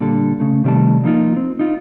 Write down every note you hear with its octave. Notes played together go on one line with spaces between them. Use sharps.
A#2 D3 G3 A4
C#3 A3
C3 D#3 G3 A3 A5
F3 A#3 D#4 F4
C4
D#4 F4